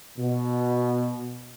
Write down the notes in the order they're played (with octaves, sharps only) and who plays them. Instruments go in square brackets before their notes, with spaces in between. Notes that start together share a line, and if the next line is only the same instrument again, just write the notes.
[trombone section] B2